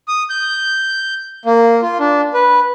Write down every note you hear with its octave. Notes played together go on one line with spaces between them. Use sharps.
D#6
G6
A#3
F4
D4
B4